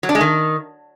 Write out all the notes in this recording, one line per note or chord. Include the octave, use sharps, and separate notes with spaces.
F#3
D4
G#3
D#3